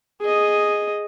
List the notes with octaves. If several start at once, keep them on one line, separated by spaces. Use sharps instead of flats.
G#4 D#5